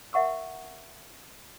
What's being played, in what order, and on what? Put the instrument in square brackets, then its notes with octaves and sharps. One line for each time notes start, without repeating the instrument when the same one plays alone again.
[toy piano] A#4 E5 F#5 C#6 E6